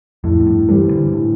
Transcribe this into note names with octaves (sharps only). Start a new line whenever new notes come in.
F2 A2
F2
G2
G2 E3 G3 C4
D3
A2